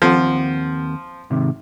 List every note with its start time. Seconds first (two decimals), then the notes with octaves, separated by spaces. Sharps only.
0.02 D#2 F3 C4 F#5
1.30 G#2 C3 D#3